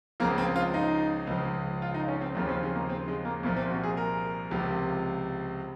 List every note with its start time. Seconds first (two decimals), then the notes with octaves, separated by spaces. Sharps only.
0.20 C#2 C#3 F3 A#3
0.38 C4
0.56 F4
0.74 D#4
1.27 C#2 C#3 F3
1.82 F4
1.94 D#4
2.08 C#4
2.21 C4
2.35 D#2 C#3 F3 A#3
2.43 C#4
2.49 C4
2.63 G#3
2.75 A#3
2.89 C4
3.08 G#3
3.25 A#3
3.43 C2 A#2 F3 A#3
3.57 C4
3.70 F#4
3.83 G#4
3.97 A#4
4.51 C#2 C3 F3